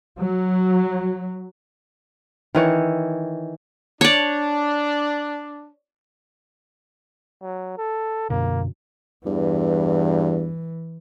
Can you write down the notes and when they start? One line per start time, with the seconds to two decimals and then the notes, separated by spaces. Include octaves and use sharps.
0.18 F#3
2.55 D#3 E3 C#5
4.01 D4 C#5 D5
7.42 F#3
7.78 A4
8.30 F#2 B2 D3 A#3
9.26 E2 G2 E3